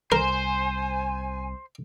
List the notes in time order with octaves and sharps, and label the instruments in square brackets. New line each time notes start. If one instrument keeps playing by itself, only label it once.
[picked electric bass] C2 [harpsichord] A#4 [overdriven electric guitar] C5 [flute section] G#5